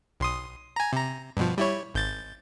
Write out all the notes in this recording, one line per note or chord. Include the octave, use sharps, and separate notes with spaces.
B1 C6 D#6
G#5 A#5
C3 A#5
G2 B2 F3
G3 E4 C#5
G#1 G6 A6